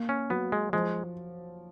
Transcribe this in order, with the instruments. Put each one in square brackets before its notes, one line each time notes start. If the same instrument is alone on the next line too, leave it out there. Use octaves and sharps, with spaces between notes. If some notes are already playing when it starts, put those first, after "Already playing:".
Already playing: [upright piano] A#3
[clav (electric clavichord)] C#4
[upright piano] F#3 [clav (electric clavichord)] B3
[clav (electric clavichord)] G#3
[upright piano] F3 [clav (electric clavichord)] G#3